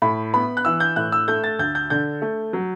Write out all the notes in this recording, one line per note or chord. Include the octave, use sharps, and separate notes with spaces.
A2 B5
B3 B5
F#6
E3 E6
G6
A2 F#6
E6
A3 G6
A6
D2 G6
G6
D3 G6
A3
F#3